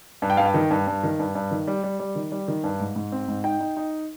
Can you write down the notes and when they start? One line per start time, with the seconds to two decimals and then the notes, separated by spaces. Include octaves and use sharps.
0.22 G2
0.30 G5
0.37 G2 F5
0.45 G5
0.54 D#3
0.71 G2
0.87 G2
1.04 D#3
1.19 G2
1.35 G2
1.51 D#3
1.67 G3
1.83 G3
2.00 G3
2.15 D#3
2.32 G3
2.48 D#3
2.64 G2
2.80 G#2
2.96 G#2
3.12 C4
3.28 G#2
3.44 D#4 G5
3.60 D#4
3.77 D#4